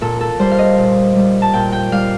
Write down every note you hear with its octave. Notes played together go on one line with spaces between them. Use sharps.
A#2 A4
A4
G3 C5
F5
D#5
A#2
G3
A5
A#2 G5
G5
G3 F5